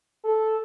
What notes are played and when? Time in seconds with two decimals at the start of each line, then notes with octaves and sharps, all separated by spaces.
0.24 A4